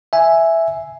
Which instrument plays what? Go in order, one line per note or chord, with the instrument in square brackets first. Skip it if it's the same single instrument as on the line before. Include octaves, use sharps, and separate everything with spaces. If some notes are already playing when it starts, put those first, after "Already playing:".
[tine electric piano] E5 G#5